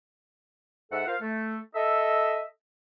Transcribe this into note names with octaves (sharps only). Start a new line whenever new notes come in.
G#2 A4 E5 F#5
F4 A#4 C5 F5
A3
A4 D#5 E5